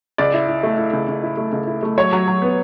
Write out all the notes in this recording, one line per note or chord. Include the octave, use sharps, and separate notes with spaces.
C#2 D5
E4
E4
A3
E4
C#2
C#2
E4
A3
C#2
E4
A3
F#3 C#5
F#3
F#3
B3